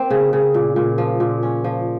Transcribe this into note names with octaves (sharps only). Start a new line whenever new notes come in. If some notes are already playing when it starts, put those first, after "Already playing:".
Already playing: A#3 C4
C#3
C#3
A#2
A#2
F3
A#2
C#4
F3